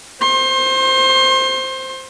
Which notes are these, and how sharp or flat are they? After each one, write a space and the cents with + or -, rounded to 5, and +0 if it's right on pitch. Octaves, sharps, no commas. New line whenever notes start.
C5 +0 C6 +30